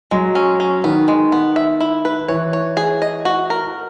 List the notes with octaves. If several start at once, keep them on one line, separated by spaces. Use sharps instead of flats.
F#3 G#3
C#4
C#4
D#3 B3
G#3
B3
E5
E4
B4
E3 C#5
C#5
G#4
D#5
F#4
A#4